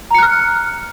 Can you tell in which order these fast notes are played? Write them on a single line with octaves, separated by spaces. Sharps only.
A#5 C#7 F#6 F6